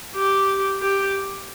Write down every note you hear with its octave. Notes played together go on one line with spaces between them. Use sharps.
G4
G4